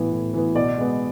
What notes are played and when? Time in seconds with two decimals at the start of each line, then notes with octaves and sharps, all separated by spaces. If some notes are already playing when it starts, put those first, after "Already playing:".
Already playing: A2 E3 B3
0.12 A2
0.34 E3 B3
0.55 B2 D5
0.78 G#3 B3